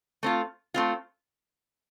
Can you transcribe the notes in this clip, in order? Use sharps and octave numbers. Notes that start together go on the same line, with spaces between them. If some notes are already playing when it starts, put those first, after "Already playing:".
A3 C4 F4
A3 C4 F4